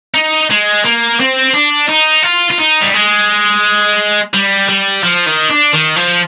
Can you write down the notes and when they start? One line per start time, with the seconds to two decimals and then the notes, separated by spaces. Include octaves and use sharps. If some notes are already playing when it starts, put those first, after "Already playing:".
0.14 D#4
0.50 G#3
0.85 A#3
1.20 C4
1.54 D4
1.89 D#4
2.23 F4
2.51 F4
2.59 D#4
2.82 G3
2.94 G#3
4.33 G3
4.69 G3
5.04 F3
5.26 D#3
5.50 D4
5.73 D#3
5.96 F3